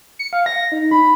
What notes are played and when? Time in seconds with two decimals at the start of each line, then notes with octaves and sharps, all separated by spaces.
0.19 C#7
0.33 F5
0.46 A#6
0.72 D#4
0.91 B5